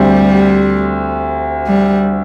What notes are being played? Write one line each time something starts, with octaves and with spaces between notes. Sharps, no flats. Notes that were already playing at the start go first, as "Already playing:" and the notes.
Already playing: D2 D3 G3 C4 G4 C5
G3